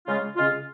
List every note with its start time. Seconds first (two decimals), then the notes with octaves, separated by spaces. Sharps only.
0.07 C#3 G#3 C#4 F4
0.36 C#3 G#3 C#4 F4